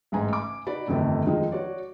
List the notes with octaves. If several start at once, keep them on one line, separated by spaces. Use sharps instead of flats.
A1 G#2 G#5 A#5
G#5 D6
D#4 F#4 D5 B5
G1 F2 D#3 A3 A5
D#3 F3 G#3
F#4 C#5 D5